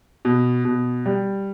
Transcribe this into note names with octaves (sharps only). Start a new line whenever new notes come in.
B2
B2
G3